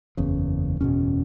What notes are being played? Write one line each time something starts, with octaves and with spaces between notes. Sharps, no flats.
F#1 E2 C#3
F#1 E2 B2 C#4